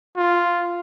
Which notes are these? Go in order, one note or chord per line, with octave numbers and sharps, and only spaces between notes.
F4